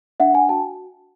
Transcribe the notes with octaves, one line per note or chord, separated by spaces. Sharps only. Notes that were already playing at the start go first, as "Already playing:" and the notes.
D4 E5 F#5
F#5 G#5
F#4 G5 A5